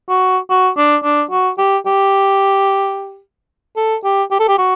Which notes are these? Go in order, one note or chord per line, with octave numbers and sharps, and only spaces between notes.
F#4
F#4
D4
D4
F#4
G4
G4
A4
G4
G4
A4
G4
F#4